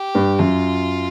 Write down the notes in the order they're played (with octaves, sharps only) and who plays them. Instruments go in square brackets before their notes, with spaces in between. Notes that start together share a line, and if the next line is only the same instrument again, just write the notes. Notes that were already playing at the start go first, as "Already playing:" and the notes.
Already playing: [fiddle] G4
[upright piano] G2
[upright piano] F#2 [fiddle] F4